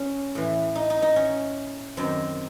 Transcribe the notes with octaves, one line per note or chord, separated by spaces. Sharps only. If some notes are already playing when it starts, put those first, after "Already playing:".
Already playing: C#4
A2 E3
D#4
D#4
D#4
C#4
F#2 D#3 C4